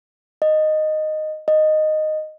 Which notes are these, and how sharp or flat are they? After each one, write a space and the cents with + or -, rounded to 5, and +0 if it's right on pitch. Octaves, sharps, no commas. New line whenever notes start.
D#5 -5
D#5 -5